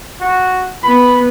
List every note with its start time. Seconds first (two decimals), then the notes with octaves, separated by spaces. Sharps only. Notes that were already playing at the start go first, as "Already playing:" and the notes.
0.21 F#4
0.84 B3 B5